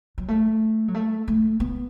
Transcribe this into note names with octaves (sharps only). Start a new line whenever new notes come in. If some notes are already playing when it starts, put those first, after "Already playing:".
F#3
A3
F#3
A3
A3
B3